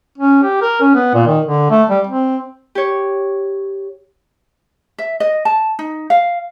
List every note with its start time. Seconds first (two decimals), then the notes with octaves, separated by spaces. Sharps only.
0.18 C#4
0.43 G4
0.62 A#4
0.81 C#4
0.95 B3
1.14 A#2
1.27 D#3
1.46 D3
1.71 A3
1.90 G3
2.07 C4
2.75 G4 C#5
4.99 E5
5.20 D#5
5.45 A5
5.79 D#4
6.10 F5